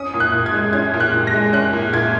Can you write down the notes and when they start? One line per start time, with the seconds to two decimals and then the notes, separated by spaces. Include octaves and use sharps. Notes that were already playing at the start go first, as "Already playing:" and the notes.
Already playing: C#4 D#6
0.14 A#2
0.20 F#6
0.33 A#2
0.46 G#6
0.54 G#3
0.73 C#4 G#6
0.94 A#2
1.00 F#6
1.14 A#2
1.27 A#6
1.34 G#3
1.53 C#4 F#6
1.73 A#2
1.93 A#2 G#6